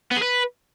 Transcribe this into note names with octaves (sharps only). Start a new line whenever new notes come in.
B3
G#4
B4